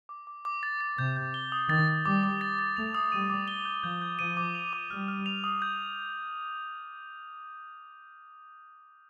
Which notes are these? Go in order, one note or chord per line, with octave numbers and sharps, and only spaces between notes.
D6
D6
D6
A6
A6
C3 G6
G6
G7
D#6
D#3 A6
A6
G3 D6
D6
A6
A6
A3 F7
D#6
G3 D#7
D6
G7
G6
F3 G6
G6
F3 D#7
D6
F7
D6
G3 F6
F6
F7
D#6
G6